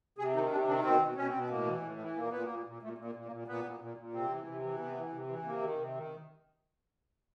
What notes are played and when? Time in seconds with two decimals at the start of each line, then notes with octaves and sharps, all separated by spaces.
0.18 C3 G#4
0.34 D#3 D#4
0.51 C3 D4
0.67 D#3 D4
0.84 B2 C4
1.01 B2
1.15 B2 C#4
1.28 C4
1.33 B2 B3
1.49 A2 A#3
1.66 E3
1.82 A2
2.00 E3
2.16 A#2 A#3
2.30 A#2 B3
2.43 A#3
2.48 A#2
2.66 A#2
2.82 A#2 A3
2.98 A#2
3.04 A#3
3.15 A#2
3.25 A#3
3.32 A#2
3.47 A#2 B3
3.65 A#2
3.80 A#2
3.97 A#2
4.13 C3 C4
4.29 E3
4.47 C3
4.62 E3
4.79 C3 B3
4.96 E3
5.13 C3
5.28 E3
5.45 C3 A#3
5.62 D#3
5.78 C3
5.95 D#3